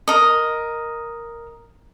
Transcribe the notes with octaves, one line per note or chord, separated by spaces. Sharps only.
A#4 D#5